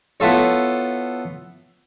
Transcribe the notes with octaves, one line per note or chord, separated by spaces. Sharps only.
B3 E4 F4 A4 C#5